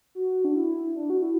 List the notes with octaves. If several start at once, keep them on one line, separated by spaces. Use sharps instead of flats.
F#4
D4
E4
D4
F#4
E4